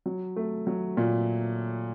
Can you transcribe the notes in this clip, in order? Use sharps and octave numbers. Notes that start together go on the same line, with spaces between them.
F#3
A3
F#3
A#2